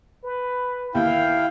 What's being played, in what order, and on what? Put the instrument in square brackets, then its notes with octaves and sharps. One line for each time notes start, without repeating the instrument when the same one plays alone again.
[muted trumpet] B4
[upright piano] D#2 [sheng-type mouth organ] E4 G5 [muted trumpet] F5